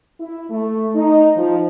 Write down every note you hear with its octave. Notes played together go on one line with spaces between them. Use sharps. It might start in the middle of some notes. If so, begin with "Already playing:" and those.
E4
A3
D#4
F3